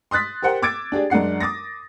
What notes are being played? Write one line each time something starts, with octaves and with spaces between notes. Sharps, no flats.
C6 D#6 F#6 A6 B6
G4 A#4 C5 F#5 G5
D6 E6 G#6 A6 D7
D4 G4 G#4 D5
F#2 G#3 D4 F#5 C7
D6 D#6 A6 A#6